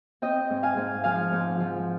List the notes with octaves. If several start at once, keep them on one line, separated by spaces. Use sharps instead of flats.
C4 D#5 G5
G#2
F5 G#5
G#2
F3 F5 G#5
G#2
F3